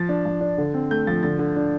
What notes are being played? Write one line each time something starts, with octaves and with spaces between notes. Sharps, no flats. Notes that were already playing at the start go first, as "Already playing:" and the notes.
Already playing: F3 A6
D4
F3
D4
D3
C4
A3 G6
F3 A6
D3 A6
D3
D4